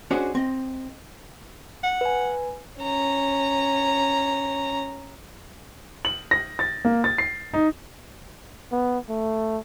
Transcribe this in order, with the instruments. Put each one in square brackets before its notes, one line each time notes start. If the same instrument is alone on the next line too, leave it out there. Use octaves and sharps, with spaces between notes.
[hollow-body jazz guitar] C#4 D4 F#4 G#4 C5 D#5
C4 D#5
[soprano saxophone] F#5
[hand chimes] B4 G#5
[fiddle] C#4 A#5
[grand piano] F#7
A#6
A6
A#3
A6
C7
D#4
[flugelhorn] B3
A3